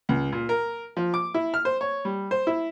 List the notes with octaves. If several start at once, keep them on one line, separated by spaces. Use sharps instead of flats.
C#2
A#2
A#4
F3
D6
E4
F6
C5
C#5
G3
C5
E4